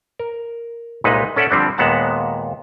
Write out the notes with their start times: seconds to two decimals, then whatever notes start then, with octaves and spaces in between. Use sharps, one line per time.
0.19 A#4
1.04 C2 A#2 G#3 D#4 B4
1.36 C#4 A4 D5 E5 F#5
1.51 D3 F3 G3 C4 D4
1.78 D#2 A#2 G#3 B3 F#5 A5